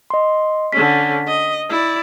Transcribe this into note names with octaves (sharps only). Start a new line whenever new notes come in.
D#5 C6
D3 C#4 B6
D#5
E4 D5